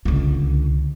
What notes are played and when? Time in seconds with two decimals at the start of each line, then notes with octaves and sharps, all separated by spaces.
0.05 C#2 D3